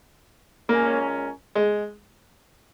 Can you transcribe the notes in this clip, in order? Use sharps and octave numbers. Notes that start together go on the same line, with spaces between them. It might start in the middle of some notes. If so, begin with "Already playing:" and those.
A#2 G#3 A#3 C#4 A#4
G#3